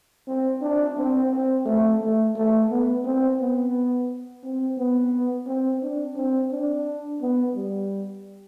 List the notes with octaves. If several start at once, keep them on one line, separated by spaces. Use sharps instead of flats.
C4
D4
C4
C4
A3
A3
A3
B3
C4
B3
C4
B3
C4
D4
C4
D4
B3
G3